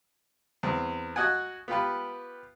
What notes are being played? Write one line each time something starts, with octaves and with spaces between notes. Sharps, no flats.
E2 C4
F#4 D#5 F#5 G#5
B3 F4 G4 B4